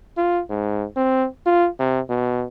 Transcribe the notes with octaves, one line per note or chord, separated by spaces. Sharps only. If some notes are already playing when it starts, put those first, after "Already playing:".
F4
G#2
C4
F4
C3
B2